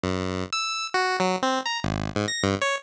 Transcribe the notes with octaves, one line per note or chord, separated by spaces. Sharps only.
F#2
E6
F#4
F#3
C4
A#5
G#1
G#2
A#6
G2
C#5